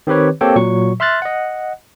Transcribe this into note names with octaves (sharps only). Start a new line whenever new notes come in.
D#3 C4 G4 B4 C#5
A#3 C4 G4 A4 C#5 G5
A#2 F#3 C#6
E5 C6 F6 F#6 A6
D#5 F#5